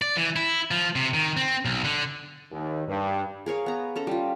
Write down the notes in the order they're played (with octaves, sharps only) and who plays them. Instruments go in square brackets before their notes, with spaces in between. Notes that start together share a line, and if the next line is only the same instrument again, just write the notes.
[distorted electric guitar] D5
E3
E4
F3
C3
D#3
C4
B1
D3
[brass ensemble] D#2
G2
[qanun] G#4 A#4 C#5 F5
B3 A#5
C#4 A4 A#5
G3 F4